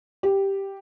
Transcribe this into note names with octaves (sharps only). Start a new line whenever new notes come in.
G4